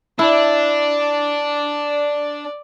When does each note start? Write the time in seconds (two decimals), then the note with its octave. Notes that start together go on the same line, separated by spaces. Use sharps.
0.19 D4 E4 D5